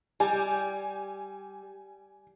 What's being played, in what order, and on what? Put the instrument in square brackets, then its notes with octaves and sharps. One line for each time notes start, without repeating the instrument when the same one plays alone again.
[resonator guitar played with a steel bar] G3 [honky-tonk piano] G#5